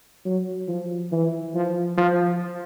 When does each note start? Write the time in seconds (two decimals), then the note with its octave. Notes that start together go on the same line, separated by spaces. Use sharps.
0.25 F#3
0.68 F3
1.12 E3
1.55 F3
1.97 F3